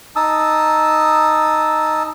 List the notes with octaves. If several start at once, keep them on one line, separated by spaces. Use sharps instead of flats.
D#4 A5 D#6 E6